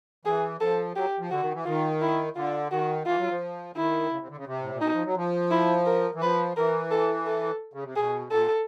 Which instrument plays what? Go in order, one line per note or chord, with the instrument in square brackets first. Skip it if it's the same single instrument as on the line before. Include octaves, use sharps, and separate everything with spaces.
[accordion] E3 [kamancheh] G#4
[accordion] F3 [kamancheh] A4
[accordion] F#3 [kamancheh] G4
[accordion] F3
[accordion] D3 [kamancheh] F#4
[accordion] D#3
E3
[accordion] D#3 [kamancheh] F4
[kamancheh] E4
[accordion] D3 [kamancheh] F4
[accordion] D#3 [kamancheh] F#4
[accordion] E3 [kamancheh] F4
[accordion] F#3
F3
[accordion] D#3 [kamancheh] E4
[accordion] C#3
C3
D3
C#3
C3
A2
A#2
[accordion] B2 [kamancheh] D#4
[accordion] F3
F#3
F3
[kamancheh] E4
A#4
[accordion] E3
[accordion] F3 [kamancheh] B4
[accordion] E3 [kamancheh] A#4
[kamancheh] A4
A4
[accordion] C#3
C3
[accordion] B2 [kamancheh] G#4
[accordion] A#2 [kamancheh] A4